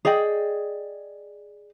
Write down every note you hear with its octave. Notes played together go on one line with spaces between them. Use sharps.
G#4 D5 D#5 G5